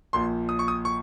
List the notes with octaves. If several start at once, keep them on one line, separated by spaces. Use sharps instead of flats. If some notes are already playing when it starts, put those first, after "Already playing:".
A#1 A#2 F3 C6
D#6
C#6
D#6
C#6